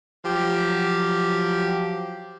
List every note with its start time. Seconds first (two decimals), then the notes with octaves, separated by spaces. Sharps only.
0.25 F3 F#3 G4